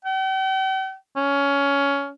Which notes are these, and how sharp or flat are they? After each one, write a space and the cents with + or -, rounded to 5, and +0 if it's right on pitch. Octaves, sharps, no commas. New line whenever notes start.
G5 -45
C#4 +15